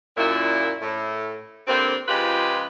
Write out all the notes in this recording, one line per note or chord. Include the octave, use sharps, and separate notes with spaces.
F#2 A#2 E4
A2
G2 D3 A#3 C4
C#3 F3 G#3 F4 G4 B4